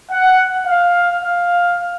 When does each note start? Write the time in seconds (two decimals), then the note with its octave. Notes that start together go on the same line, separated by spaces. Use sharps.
0.11 F#5
0.67 F5
1.24 F5